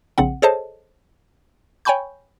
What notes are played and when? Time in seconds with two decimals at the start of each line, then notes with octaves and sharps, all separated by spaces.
0.18 A#1 C#3 C4 F#5
0.42 G#4 A4 C5 C#5 D#5 A5
1.85 C#5 G5 G#5 B5 C#6 G6